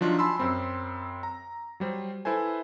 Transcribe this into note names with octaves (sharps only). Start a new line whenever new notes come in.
F3 F#3 D4 D#4 F4
G#5 A5 B5 C6 E6
F#2 C4 B5 C6
A#5
F#3 G3 C5
E4 A4 B4 C5 G#5